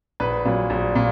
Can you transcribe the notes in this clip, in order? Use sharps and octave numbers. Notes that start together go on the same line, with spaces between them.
A#1 B4
A#2 F#3
A#1
A#2